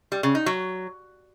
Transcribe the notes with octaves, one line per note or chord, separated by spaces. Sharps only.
G3
C#3
D#4
F#3